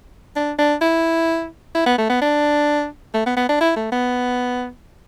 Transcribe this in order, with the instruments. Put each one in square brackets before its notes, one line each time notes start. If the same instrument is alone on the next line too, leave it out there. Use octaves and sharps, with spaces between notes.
[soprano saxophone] D4
D4
E4
E4
B3
A3
B3
D4
A3
B3
B3
D4
E4
A3
B3